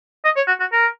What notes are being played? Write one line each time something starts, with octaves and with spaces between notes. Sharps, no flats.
D#5
C#5
F#4
F#4
A#4